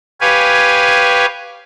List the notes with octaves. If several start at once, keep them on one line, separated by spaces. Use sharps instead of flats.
G4 B4 C#5 F5 G#5